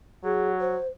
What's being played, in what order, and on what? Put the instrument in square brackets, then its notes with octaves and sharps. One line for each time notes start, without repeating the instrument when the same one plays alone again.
[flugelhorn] F#3 [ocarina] G#4
[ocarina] C5